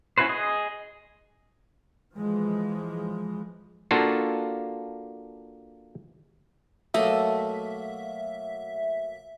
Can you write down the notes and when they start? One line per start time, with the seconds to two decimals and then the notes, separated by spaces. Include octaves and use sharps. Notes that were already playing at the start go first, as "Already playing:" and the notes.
0.18 C#4 E4 F#4 B4 C5
0.29 G#4 D#5
2.15 E3 F3 G#3
3.91 A#3 D4 F4 F#4 A4
6.94 B2 F#3 A3 A#3 D#5 E5